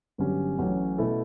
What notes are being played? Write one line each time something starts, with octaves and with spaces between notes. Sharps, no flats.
G1 G2 F#3 C#4 G4
A1 A2 F#3 C#4
B2 A3 E4 A4